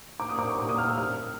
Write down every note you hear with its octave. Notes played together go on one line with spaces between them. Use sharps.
D6
D#6
D6
C#6
D6
D#6
F6
E6
F6